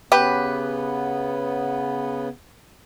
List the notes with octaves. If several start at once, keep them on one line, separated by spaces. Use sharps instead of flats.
C#3 B3 G4 B4